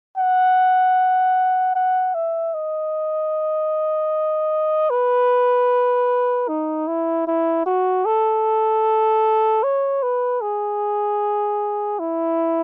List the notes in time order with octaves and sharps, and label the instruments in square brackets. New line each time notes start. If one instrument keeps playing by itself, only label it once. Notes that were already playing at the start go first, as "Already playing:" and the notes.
[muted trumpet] F#5
F#5
E5
D#5
B4
D#4
E4
E4
F#4
A4
C#5
B4
G#4
E4